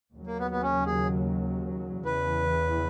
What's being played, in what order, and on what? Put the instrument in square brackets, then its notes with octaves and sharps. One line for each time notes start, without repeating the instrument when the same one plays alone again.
[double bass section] D#2 C#3 F#3
[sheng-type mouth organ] A#3
B3
B3
C#4
G#4
[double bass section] E2 C#3 E3 [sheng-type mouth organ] B4